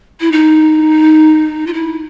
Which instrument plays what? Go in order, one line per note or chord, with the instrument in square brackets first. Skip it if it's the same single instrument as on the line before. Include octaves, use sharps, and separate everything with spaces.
[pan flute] E4
D#4
F4
E4